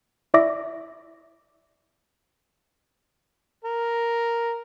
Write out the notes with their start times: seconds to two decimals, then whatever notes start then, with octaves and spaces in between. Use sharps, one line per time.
0.34 E4 D5 E5 D6 A#6
3.65 A#4